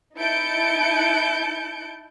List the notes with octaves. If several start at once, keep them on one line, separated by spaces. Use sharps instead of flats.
D#4 E4 A5 G6 C#7 D7